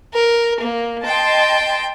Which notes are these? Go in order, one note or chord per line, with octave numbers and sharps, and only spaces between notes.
A#4
A#3
D#5 G5 A5 C6